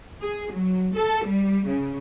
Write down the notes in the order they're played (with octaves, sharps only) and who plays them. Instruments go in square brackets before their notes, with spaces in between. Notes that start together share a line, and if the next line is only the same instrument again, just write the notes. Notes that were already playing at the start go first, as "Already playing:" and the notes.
[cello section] G#4
F#3
A4
G3
C#3